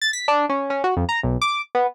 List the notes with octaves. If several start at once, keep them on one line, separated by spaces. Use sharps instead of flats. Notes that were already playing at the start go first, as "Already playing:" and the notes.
A6
B6
D4
C#4
C#4
F#4
F2
A#5
B1
D6
B3